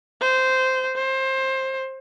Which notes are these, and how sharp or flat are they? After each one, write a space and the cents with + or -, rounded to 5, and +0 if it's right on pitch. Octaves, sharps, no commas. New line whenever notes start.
C5 -10
C5 +20